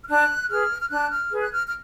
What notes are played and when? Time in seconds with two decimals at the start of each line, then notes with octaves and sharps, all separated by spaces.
0.04 F6
0.09 D4 F#6
0.50 G#4 B4 F6
0.81 F6
0.90 D4 F#6
1.11 F6
1.31 G#4 B4
1.40 F#6
1.52 F6
1.66 F6